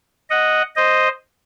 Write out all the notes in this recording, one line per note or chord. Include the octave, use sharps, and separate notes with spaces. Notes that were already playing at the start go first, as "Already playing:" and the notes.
D#5 F#5
C5 D#5